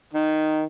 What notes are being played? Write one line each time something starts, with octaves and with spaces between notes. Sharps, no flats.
D#3